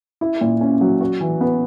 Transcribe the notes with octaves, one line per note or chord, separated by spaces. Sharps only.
E4
A#2
C#4
F#3
F#4
E3
B3